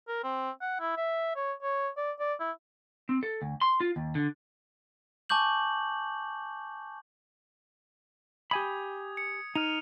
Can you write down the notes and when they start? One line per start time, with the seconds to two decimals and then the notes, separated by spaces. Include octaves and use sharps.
0.08 A#4
0.23 C4
0.61 F#5
0.80 E4
0.97 E5
1.36 C#5
1.62 C#5
1.97 D5
2.19 D5
2.40 E4
3.09 C4
3.23 A4
3.42 D2
3.61 C6
3.80 F4
3.96 D#2
4.15 D3
5.30 G#5 A5 C#6 D6 G6 F#7
8.51 G4 G#5 B5 D#6 G#6
9.17 C#7
9.55 D#4 F6 D#7 F7